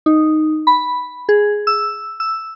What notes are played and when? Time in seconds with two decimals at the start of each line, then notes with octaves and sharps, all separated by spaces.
0.06 D#4
0.67 B5
1.29 G#4
1.67 E6
2.20 E6